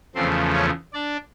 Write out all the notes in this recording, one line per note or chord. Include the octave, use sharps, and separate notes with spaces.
E2 C#3 F3 A3 C4 C5
C#4 C#5
D4 D5